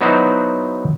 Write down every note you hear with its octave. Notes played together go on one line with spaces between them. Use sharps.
F#3 B3 D#4 E4 F#4 C5